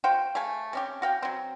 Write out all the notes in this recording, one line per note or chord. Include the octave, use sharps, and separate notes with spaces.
F#4 C5 F5 G5
A3 G#4 F5 G#5
C3 C#4 G4
F#4 F5 G5
F#3 C4